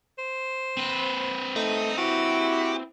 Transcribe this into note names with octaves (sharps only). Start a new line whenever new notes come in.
C5
C4 B4
A3 D#4
E4 F#4 G4